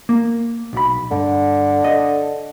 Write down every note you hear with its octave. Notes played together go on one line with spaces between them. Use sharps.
A#3
B1 B5
G2 D3
D#5